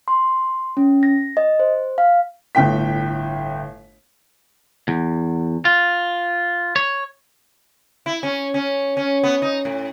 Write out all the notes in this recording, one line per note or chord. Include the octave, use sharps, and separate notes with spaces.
C6
C#4
A#6
D#5
C5
F5
G1 A2 G5 B6
E2
F4
C#5
E4
C#4
C#4
C#4
B3
D#4
A2